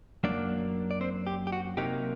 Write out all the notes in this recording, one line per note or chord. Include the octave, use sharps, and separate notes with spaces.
F#2 F#3 A#3 D4 D5
D5
C4 C5
G4
G4
F#4
C3 F#3 A#3 D#4 G4